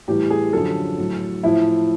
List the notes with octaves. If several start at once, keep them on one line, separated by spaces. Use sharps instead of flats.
A2 E3 G3 G4
G#4
F#2 D3 F3 A4
A2 F#3
A2 F3 E4